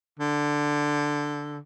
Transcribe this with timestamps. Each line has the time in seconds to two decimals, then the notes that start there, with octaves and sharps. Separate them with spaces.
0.19 D3